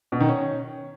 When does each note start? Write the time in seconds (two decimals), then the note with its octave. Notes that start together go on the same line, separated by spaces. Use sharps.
0.12 B2
0.20 D#3
0.29 C#4